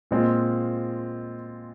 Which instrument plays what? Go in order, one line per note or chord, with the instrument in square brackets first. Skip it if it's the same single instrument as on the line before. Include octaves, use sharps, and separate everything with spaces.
[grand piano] A#2 G#3 C4 F4